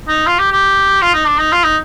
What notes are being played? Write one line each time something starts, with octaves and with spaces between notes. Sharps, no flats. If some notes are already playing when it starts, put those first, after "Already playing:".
D#4
F4
G4
G4
F4
D#4
D4
D#4
F4
D#4